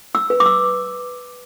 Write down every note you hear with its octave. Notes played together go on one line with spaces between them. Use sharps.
E6
B4
D6
E6